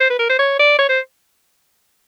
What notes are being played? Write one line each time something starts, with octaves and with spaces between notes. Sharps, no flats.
C5
B4
A#4
C5
C#5
D5
C#5
C5